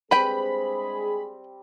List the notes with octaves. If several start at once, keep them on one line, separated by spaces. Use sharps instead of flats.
G3 G#3 C4 D4 G#4 B4 G5 B5